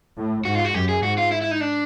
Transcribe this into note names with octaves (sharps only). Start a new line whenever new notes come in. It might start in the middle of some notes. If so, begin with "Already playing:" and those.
A2
G#2 F#4
F4
F#4
F#2 G4
G#4
G#2 F#4
F4
E4
E4
D#4
D4